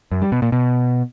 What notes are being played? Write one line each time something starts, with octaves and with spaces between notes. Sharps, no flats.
F#2
G3
B2
A#2
B2